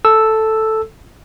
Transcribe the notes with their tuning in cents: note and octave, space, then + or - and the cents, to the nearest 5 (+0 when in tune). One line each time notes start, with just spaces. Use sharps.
A4 +0 E6 +0